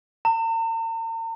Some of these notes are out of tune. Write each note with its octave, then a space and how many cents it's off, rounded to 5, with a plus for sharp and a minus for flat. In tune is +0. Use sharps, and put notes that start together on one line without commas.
A#5 -45